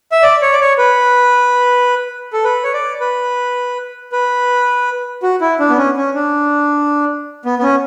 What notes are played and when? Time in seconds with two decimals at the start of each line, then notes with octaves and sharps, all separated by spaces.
0.12 E5
0.22 D5
0.42 C#5
0.52 D5
0.61 C#5
0.78 B4
2.33 A4
2.44 B4
2.64 C#5
2.73 D5
3.00 B4
4.12 B4
5.23 F#4
5.41 E4
5.59 D4
5.69 B3
5.78 C#4
5.97 C#4
6.14 D4
7.45 B3
7.59 B3
7.63 C#4